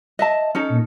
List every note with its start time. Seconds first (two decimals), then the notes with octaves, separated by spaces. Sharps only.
0.19 D#5 E5 A5
0.55 C#4 D#4 A4
0.69 A#2